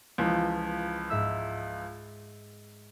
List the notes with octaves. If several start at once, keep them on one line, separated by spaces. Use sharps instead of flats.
C#2 E3 F3
G#2 E5 E6